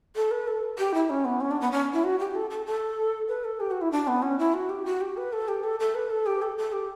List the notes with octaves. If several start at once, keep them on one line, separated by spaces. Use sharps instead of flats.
A4
B4
A4
G4
E4
C#4
B3
C#4
D4
B3
C#4
E4
F#4
G4
A4
A4
A4
B4
A4
G4
F#4
E4
D4
B3
C#4
E4
F#4
G4
F#4
G4
B4
A4
G4
A4
A4
B4
A4
G4
A4
A4
G4